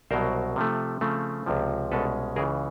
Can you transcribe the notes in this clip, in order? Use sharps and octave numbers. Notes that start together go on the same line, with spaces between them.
C2 B2 F#3 A#4 C5
C3 F3 A3
C#3 F3 A3 C4
C#2 C3 F3
C2 B2 G#3 C#4 A4 B4
C#2 C#3 E3 G#4 A#4